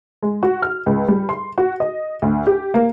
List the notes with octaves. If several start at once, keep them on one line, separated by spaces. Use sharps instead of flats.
G#3
F#4
F6
C#2
G3
C6
F#4
D#5
D2
G4
A#3